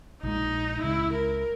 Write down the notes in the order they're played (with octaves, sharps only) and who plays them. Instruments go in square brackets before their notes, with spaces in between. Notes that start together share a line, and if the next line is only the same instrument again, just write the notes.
[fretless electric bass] A#1 A#2 G#3 [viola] D#4
[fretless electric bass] C#2 C#3 G#3 [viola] E4
[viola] A#4